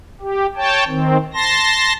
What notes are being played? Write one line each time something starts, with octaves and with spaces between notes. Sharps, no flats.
G4
C#5 G5 A5
D#3 C4
A5 C6 A#6